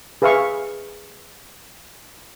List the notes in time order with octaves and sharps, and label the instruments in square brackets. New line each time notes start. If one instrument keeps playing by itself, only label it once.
[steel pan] G#4 B4 E5 F5 G#5 C#6